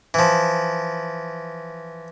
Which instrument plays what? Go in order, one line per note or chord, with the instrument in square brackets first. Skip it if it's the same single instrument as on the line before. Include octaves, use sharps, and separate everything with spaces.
[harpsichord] E3 F3